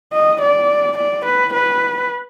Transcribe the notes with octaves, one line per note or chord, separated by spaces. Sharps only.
D#5
D5
D5
B4
B4